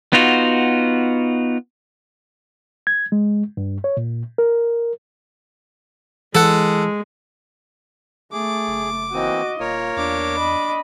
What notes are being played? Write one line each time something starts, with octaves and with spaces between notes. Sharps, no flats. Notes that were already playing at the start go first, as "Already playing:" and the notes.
B3 D#4 F4 F#4
G#6
G#3
G2
C#5
A#2
A#4
E3 G#3 A4 F#5
A3 G#4 D6
F#1
E3 A#3 C4 F#4 D#5
D#1 A#3 F4 A#4 C#5
E2 D4 D6
D#5 B5